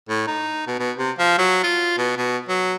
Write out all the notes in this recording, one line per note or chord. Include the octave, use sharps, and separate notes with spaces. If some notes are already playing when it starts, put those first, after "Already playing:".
A2
D#4
B2
B2
C3
F3
F#3
F4
B2
B2
F#3